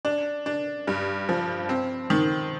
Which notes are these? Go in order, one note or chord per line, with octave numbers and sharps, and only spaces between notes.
D4
D4
G2
F3
C4
D#3